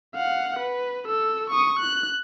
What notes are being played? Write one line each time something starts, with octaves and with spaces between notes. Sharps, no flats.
F5 F#5
B4
A4 E6
C#6 D#6
F#6